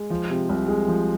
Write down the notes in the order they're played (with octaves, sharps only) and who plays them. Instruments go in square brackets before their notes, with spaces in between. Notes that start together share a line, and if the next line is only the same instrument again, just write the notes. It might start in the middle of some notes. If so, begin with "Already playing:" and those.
Already playing: [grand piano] G#3
F3
C3
C2
G#3
F3